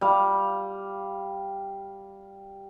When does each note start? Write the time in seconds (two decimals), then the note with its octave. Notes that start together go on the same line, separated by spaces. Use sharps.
0.01 G3 F5